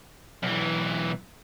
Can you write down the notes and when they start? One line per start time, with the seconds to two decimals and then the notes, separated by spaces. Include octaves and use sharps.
0.43 B1 E3